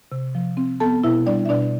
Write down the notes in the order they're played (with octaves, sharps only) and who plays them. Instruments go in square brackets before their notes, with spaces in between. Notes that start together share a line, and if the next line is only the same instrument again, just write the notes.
[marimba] C3
F3
C4
B3 A4 A5
B2 E4 E5
G3 D4 D5
E5
B2 D4 D5